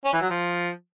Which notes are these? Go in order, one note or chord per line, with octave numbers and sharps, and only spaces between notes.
C#4
E3
F#3
F3